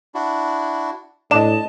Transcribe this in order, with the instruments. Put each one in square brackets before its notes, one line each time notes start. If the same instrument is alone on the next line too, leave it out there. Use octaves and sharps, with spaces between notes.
[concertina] D4 E4 F#4
[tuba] A2 [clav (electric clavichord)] D4 [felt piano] D#5 E7 [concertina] A5